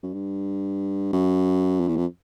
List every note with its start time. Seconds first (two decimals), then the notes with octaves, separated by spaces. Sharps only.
0.03 F#2
0.14 G2
1.13 F#2
1.80 F2
1.88 E2
1.97 F2